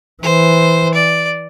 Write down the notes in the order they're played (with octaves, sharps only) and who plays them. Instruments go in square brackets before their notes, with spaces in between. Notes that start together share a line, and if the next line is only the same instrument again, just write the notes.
[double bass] E3 [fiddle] C5
[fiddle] D5